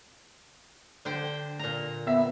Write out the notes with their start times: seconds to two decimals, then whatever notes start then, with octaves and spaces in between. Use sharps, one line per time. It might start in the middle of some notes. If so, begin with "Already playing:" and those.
1.05 D3 C5 G5
1.59 A#2 A#5
2.07 B3 E5